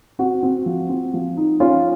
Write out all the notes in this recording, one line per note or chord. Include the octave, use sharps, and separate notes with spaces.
C4 F#4
C4
F3
C4
F3
D#4
C#4 F4